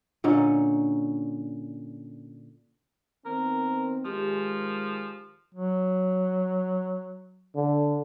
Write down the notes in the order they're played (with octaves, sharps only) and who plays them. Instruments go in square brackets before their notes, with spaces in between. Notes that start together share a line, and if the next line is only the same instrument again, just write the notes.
[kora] A#2 D3 C#4 D#4
[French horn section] D#3 B3 C4 [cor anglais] A#4
[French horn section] D#3 G#3 [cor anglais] F3 [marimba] G4
[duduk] F#3
[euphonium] D3